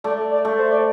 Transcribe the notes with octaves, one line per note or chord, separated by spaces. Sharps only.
A3 D5
D5
A3
C5
D5